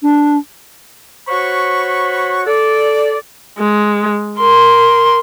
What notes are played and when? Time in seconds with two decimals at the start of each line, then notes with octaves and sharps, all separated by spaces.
0.03 D4
1.28 F#4 C5 C#5 F#5 B5 C#6
2.46 A4 D5
3.58 G#3
4.40 A#4 C6